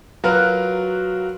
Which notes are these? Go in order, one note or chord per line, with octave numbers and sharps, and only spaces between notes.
F#3 F4 F#4 A#4 B4